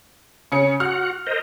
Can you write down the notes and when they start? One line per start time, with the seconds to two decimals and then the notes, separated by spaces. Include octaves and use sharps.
0.52 C#3 C#4 C#7
0.80 F#4 F#5 F6
1.27 A#4 C5 D#5